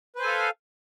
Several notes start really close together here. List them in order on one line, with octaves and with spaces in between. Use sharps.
B4 C5 G#5 A4 F5